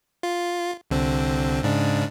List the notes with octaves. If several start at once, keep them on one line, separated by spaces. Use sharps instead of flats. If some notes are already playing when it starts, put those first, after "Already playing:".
F4
C2 D3 C4
G#2 C#3 D4